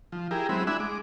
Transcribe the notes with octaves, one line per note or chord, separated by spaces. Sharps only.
F3
E4 G4 G#4 A#4
F#3 G#3 C4 E4 B5
D4 E4 E5 F#5 G#5 B5
G#3 D6